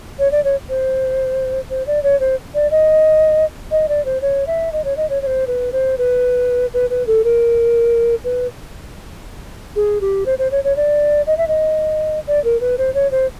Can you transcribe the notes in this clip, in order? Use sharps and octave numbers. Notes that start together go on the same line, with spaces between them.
C#5
D5
C#5
C5
C5
D5
C#5
C5
D5
D#5
D#5
D5
C5
C#5
E5
D#5
C#5
D#5
C#5
C#5
C5
B4
C5
B4
B4
B4
A4
A#4
B4
G#4
G4
C5
C5
C#5
C#5
D5
D#5
E5
D#5
D5
A#4
B4
C5
C#5
C5